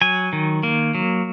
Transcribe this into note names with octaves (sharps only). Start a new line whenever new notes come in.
F#3 G#5
D#3
A#3
F#3